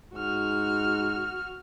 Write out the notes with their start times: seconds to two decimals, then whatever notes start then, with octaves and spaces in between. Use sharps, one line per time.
0.14 G#2 F#4 F6